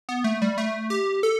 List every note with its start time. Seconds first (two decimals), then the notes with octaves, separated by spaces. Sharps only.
0.09 B3
0.24 A3
0.42 G3
0.58 A3
0.90 G4
1.23 A4